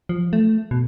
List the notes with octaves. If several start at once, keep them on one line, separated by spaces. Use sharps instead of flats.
F3
A3
B2